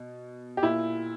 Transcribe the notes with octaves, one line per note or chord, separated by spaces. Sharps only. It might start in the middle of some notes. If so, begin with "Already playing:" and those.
Already playing: B2
G4
A#2 E4